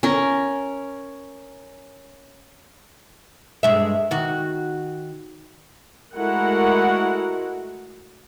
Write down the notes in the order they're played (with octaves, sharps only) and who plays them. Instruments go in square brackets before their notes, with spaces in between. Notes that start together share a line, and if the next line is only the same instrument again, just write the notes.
[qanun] C#4 A#4
[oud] G2 G#3 E5
D#3 F#4
[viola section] G#3 A3 E4 F#4 A#4 F#5